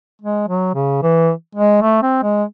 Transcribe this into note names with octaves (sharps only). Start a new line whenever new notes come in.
G#3
F#3
C#3
E3
G#3
A3
C4
G#3